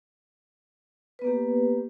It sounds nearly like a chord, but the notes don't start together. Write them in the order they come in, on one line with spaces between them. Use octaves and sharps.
B4 B3 A#3 G4